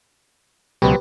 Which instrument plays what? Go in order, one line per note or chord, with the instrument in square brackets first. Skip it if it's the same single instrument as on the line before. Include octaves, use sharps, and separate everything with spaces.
[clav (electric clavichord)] C#2 B2 [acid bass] F#3 [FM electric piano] G4 B4 C5